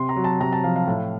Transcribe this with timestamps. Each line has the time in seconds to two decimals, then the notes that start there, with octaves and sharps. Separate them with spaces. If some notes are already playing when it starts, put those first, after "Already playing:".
Already playing: C3 C6
0.09 A#5
0.16 F#3
0.24 A5
0.41 C3 A#5
0.53 A5
0.64 F3 F5
0.76 F5
0.87 A2